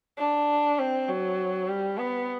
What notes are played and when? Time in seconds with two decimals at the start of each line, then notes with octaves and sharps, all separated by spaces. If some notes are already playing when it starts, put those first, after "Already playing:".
0.19 D4
0.79 C4
1.09 F#3
1.68 G3
1.98 B3